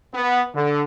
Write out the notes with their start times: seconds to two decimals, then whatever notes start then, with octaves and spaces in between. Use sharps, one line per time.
0.14 B3
0.54 D3